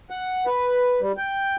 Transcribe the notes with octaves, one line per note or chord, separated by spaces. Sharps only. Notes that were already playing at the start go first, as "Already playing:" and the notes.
F#5
B4
G3
G5